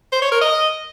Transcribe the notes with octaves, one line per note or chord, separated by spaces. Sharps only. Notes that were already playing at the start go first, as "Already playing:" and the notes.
C5
C#5
A#4
D#5